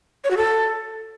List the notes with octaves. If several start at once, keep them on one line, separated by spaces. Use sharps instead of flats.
C#5
F#4
A4